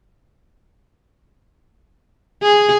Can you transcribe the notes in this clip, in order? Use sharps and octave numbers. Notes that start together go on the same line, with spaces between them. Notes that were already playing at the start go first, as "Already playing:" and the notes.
G#4